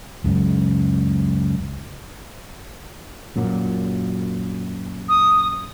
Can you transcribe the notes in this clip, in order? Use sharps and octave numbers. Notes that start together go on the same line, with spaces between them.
C#2 F#2 C#3
F#2 A#2 F#3
D#6